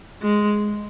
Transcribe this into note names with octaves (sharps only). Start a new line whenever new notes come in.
G#3